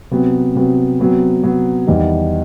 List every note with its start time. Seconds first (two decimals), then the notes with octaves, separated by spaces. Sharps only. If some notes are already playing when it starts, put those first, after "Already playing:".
0.11 C3 F#3 B3
0.55 C3 F#3 B3
1.00 C3 F#3 B3
1.43 C3 F#3 B3
1.87 E2 D#3 G3 D#4